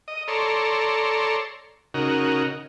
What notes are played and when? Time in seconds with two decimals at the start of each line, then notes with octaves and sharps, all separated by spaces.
0.08 D#5
0.28 A4 C#5 D5 A#5 C6
1.94 C#3 D#4 F#4 A#4